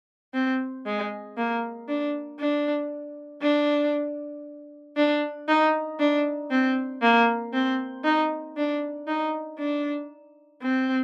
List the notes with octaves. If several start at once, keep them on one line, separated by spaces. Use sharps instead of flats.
C4
G#3
A#3
D4
D4
D4
D4
D#4
D4
C4
A#3
C4
D#4
D4
D#4
D4
C4